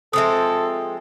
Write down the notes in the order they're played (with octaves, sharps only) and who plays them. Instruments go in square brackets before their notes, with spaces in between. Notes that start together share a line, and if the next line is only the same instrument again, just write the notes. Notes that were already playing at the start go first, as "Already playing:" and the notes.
[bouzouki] F3 G#3 C4 [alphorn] A4 [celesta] E5 D#6